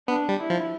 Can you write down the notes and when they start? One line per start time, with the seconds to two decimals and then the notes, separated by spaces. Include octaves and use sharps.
0.08 B3 D4
0.29 G3
0.40 E4
0.50 F3